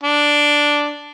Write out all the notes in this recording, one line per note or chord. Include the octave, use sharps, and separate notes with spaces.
D4